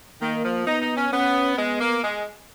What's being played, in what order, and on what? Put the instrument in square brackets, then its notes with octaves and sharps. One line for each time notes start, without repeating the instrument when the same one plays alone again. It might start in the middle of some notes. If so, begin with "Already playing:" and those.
[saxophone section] D#3 [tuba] A#3
[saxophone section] F3
[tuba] B3 [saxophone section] D#4
[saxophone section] D#4
C#4
[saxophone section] B3 [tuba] C#4
[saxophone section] G#3 [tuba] B3
[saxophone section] A#3
G#3